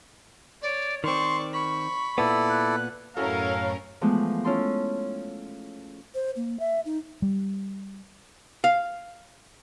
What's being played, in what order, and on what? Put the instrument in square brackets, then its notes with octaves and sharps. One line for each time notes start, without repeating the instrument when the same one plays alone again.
[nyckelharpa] C#5 [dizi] D5
[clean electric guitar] D#3 C4 [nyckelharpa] D5 C#6 [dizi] C6
[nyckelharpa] B5 [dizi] C#6
[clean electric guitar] A#2 B3 [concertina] E4 A4 D5
[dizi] F#6
[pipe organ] F#2 A2 [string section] C#4 A#4 [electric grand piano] E4 F#4 A4 [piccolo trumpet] F5
[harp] E3 F3 G#3 A3 B3
C#4 E4 F4 A4 C6
[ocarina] C5
A#3
E5
D#4
[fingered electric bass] G3
[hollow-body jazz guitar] F5